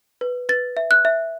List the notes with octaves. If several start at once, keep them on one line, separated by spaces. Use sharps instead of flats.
B4
B4 A6
E5
F#6
E5